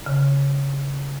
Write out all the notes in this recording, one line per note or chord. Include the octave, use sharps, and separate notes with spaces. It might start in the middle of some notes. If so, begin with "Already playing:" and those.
C#3